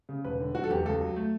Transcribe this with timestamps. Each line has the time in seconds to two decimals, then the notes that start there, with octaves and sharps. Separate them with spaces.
0.09 C#3
0.25 E1 B4
0.40 D3
0.55 F#3 F#4
0.64 A4
0.70 E2 G4
0.85 C#2 A4
1.01 F#3
1.16 A3